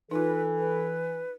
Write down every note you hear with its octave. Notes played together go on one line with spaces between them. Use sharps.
E3 D#4 F4 A4 B4
B4